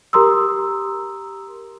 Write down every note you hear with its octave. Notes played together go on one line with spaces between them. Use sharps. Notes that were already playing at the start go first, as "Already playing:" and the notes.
G4 A#4 A#5 C6 D#6 E6